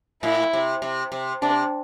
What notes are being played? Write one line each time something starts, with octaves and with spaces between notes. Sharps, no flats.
A2 E4
C3
C3
C3
C3 D4